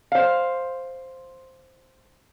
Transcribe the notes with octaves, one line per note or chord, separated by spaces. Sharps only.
C5 F5